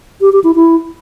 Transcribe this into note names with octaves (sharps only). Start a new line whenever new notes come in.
G4
G4
E4
E4